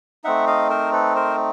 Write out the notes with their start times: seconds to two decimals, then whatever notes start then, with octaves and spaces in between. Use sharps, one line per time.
0.24 A3 C4 D#4 E5 F#5
0.47 D#5 F5
0.70 A#4 C5
0.93 A4 B4
1.15 A#4 C5